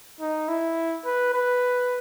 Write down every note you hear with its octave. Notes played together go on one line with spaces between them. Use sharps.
D#4
E4
B4
B4